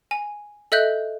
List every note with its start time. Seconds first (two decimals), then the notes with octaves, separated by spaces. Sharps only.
0.11 G#5
0.72 A4 D#5 E5 F#6 G6